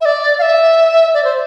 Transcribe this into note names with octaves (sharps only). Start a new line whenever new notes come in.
E5
D5
F5
E5
D5
C5